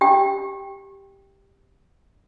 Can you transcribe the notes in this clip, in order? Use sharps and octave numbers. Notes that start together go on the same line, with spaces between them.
G4 G5